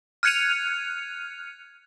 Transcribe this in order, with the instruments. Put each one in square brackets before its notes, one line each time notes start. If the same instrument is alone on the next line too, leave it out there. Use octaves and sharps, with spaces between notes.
[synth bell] F6 F#6 G#6 C#7 D#7 F7